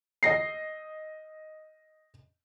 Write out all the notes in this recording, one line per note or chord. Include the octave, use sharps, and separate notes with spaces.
D#5 A#6 C7